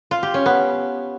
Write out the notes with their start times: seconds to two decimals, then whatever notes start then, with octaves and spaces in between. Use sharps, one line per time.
0.11 F4
0.23 G4
0.34 C#4
0.46 B3